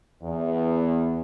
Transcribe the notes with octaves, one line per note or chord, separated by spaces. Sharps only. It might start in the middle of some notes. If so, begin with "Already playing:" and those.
E2